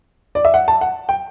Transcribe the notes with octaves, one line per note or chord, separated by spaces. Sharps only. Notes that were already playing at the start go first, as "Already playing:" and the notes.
D5
E5
F#5
A5
F#5
G5